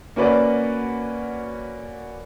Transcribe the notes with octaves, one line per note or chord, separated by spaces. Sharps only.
A#3 C#4 F#4 B4 C#5 D5